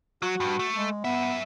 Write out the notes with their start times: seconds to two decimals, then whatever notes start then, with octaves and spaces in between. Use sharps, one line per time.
0.22 F#3 F#4
0.40 G2
0.59 A3
0.76 G#3
1.04 F#2 B3 E5